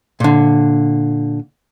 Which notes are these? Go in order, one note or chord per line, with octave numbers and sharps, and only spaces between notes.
A#2 D3